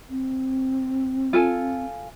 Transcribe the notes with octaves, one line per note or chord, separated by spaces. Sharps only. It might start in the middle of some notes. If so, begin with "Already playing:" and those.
C4
F4 A4 G#5